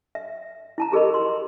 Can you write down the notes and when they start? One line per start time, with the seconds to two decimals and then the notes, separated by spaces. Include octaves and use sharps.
0.15 E5
0.78 E4 A5 A#5
0.92 G4 G#4 A#4 D#5 B5
1.14 C6